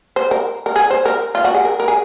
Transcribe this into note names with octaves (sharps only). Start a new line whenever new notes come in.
C5
A#4
A#4
G#4
C5
A#4
F4
F#4
G#4
A#4
A#4
G#4